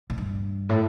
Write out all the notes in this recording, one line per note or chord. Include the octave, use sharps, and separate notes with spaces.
A2
G2
A2